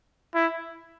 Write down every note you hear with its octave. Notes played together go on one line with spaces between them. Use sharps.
E4